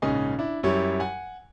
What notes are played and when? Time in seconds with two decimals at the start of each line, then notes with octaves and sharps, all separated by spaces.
0.02 A#1 G#2 C#3 C#4 D#5 G#5
0.39 D4 E4
0.63 F#2 G3 E4 G4 C#5
1.00 F#5 G#5